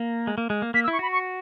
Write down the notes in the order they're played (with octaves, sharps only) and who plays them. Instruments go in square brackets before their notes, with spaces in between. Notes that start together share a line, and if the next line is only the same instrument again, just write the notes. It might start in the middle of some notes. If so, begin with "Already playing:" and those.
Already playing: [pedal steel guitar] A#3
G#3
A#3
G#3
A#3
[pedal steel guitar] A#3 [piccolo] B6
[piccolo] E6
[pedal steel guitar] E4
[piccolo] C#6
[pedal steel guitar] F#4 [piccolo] B5
[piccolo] C#6